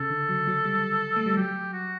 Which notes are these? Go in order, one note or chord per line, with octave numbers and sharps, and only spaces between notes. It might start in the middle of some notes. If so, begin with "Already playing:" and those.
Already playing: C#3 A4
D3
F#3
F#3
G3
A3
G3
F#3 G4
F#4